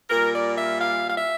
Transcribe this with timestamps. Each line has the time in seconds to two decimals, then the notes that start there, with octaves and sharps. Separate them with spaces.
0.10 A#2 G3 A#4
0.33 D5
0.57 E5
0.79 F5
1.09 F5
1.15 E5